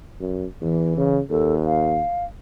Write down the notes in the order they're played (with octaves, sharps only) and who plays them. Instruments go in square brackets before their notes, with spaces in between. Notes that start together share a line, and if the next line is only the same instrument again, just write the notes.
[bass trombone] F#2
[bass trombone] E2 [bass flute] E3
[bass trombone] C#3
[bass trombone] D#2 [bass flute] A4
[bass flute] F5